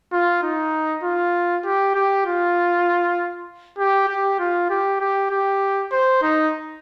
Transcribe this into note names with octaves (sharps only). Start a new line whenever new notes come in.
F4
D#4
F4
G4
G4
F4
G4
G4
F4
G4
G4
G4
C5
D#4